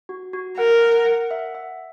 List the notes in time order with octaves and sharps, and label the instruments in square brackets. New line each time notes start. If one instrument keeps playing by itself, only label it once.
[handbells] F#4
F#4
[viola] A#4 [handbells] F#5
[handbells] F#5
F#5
E5
E5